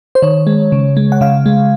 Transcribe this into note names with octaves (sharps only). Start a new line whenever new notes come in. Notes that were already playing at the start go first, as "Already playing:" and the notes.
C5
D#3 C#5
G#3
C#3
G#3
F#5
C#3 F5
G#3